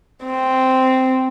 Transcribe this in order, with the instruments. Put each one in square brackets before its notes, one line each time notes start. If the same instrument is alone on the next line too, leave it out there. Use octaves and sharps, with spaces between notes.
[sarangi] C4